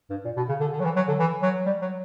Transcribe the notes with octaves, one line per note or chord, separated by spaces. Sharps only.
G2
A#2
B2
C#3
D3
D3
F#3
E3
F#3
D3
E3
F#3
G3
F#3